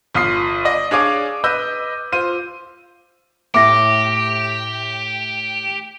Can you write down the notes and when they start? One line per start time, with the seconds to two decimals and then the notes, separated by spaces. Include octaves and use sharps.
0.14 G1 F4 D#6 C7
0.65 D5 D#5
0.91 D4 G#4 C#5 F5 G#5 D6
1.44 B4 D#5 B5 E6 G6
2.12 F4 C5 D#7
3.54 A2 G4 D6 A#6